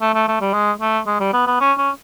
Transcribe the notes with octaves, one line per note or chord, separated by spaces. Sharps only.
A3
A3
A3
G3
G#3
A3
G#3
G3
B3
B3
C#4
C#4